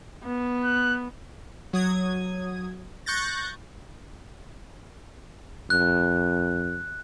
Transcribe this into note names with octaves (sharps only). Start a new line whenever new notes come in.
B3
F#6
F#3 D#6 G#6
C#6 F#6 G6 A6 A#6
F2 F#6